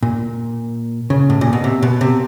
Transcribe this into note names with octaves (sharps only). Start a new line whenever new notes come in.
A#2
C#3
A2
A#2
B2
C3
B2
C3